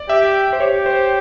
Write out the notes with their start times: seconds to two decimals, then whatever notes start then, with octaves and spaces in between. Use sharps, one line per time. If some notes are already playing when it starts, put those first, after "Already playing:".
Already playing: D5
0.09 G4 E5
0.53 C5
0.60 G4 C#5
0.86 C5